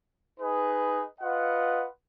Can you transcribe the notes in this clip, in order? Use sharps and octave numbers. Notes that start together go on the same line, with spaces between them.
D#4 G#4 B4
F4 B4 D#5 F#5